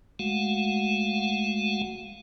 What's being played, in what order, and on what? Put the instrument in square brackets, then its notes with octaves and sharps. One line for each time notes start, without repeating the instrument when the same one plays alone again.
[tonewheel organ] G#3 A3 F#4 F5 F#5